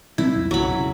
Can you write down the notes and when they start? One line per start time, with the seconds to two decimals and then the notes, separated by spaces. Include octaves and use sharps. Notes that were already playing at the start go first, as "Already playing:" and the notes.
0.18 A#2 F#3 C4 E4
0.33 C2 F2
0.51 B1 F#2 C#3 F#3 B5
0.78 E1 C#3